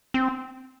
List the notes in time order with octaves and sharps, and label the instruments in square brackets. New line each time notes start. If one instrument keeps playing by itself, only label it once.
[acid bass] C4